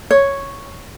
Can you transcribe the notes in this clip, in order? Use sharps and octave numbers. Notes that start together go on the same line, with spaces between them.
C#5